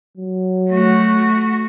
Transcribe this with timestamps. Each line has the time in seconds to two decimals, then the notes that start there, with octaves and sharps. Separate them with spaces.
0.17 F#3
0.70 A3 F#4